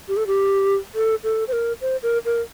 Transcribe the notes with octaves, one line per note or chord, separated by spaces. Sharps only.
G4
A4
G4
A4
A4
C5
A#4
C5
A#4
A#4